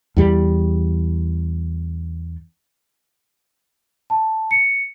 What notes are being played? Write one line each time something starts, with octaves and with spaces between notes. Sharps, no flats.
E2 G3
A5
C#7